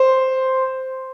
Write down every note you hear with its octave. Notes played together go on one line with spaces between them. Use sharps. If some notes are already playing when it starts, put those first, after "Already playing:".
Already playing: C5